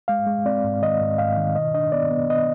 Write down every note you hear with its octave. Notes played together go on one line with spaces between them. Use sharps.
G#3 F5
G#3
C4 D5
G#2
D#3 D#5
G#2
G#2 F5
D#3
B2 D#5
D4 D#5
B3 D5
B3
B3 D#5